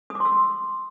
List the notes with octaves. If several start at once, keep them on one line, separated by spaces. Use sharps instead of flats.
D#6
D6
C6
E6